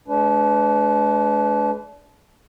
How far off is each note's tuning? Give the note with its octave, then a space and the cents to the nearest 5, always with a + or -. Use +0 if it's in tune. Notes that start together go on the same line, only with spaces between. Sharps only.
G#3 +40 D4 -30 B4 +20